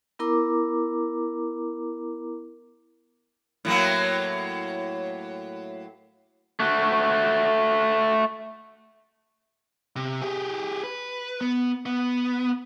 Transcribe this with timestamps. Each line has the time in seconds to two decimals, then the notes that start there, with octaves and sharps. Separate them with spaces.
0.19 B3 E4 A#4 A#5 D6
3.65 A2 F#3 A#3
6.60 A3 F#4
9.96 C3
10.21 G4 G#4
10.84 B4
11.41 B3
11.86 B3